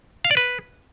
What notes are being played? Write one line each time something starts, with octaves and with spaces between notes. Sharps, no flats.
F5
D5
B4